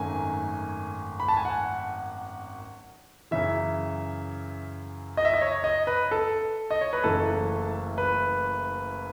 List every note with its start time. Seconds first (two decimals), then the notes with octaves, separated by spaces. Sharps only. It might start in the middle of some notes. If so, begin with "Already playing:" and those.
Already playing: G#1 F#2 D#3 A3 G#5
1.20 B5
1.28 A5
1.37 G#5
1.45 F#5
3.31 F#2 C#3 E3 E5
5.17 D#5
5.25 E5
5.34 D#5
5.42 C#5
5.64 D#5
5.87 B4
6.11 A4
6.71 D#5
6.81 C#5
6.93 B4
7.04 F#1 F#2 E3 A3 A4
7.98 B4